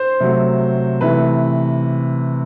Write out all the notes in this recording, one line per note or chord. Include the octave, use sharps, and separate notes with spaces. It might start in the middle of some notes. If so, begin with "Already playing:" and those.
Already playing: C5
C3 F#3 A3
C3 E3 A3 B4